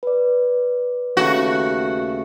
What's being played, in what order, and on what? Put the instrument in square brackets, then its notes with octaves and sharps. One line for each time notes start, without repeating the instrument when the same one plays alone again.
[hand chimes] B4 D5
[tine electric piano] D#2 C#3 A3 [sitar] F#4